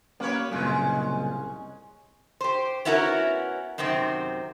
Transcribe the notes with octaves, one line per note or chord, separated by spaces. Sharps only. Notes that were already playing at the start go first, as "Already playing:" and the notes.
F#3 A#3 C#4 B4 C#5
C2 F#2 A#2 C#3 G#3 C#4
G4 C5
B3 C#4 E4 F#4 G4 A#4
F#2 C3 D#3 C4